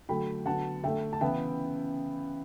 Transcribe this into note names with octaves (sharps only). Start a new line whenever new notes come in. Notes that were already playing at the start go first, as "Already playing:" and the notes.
D3 F#3 A3 G5 B5
D3 F#3 B3 F#5 A5
D3 A3 E5 G5
A5
C#3 E3 B3 E5 G5